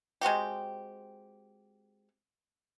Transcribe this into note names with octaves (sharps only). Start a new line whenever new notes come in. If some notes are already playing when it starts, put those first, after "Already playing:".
G#3 C4 F#4 G4